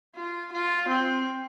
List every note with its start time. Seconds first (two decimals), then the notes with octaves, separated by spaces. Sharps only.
0.16 F4
0.52 F4
0.88 C4